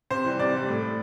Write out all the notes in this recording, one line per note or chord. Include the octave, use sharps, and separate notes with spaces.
C3 C5
E3 G3
C3 D5
E3 G3
A2
A3